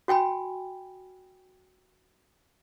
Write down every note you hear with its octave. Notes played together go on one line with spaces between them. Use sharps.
F#4 G5 G#5 B5